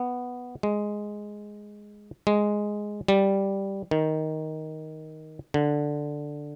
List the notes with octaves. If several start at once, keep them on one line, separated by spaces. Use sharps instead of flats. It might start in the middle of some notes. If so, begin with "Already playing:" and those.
Already playing: B3
G#3
G#3
G3
D#3
D3